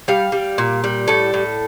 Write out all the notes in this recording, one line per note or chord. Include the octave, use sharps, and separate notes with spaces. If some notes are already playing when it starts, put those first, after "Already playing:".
G3 F5
G3
A#2
G3
A2 A4
A2